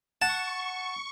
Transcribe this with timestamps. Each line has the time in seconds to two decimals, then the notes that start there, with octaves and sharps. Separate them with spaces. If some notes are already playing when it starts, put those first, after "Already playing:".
0.22 F#5 A5 C#6